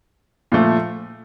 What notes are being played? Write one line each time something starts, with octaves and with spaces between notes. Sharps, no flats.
A#2 F3 A3